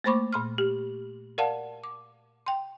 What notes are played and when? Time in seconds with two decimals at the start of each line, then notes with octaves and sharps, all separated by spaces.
0.04 A3 A#3 C5 B5 C#6 D6
0.33 A#2 C6 F6
0.58 G4
1.38 A#4 D5 F5 F#5 A5
1.84 D6
2.46 G5 C6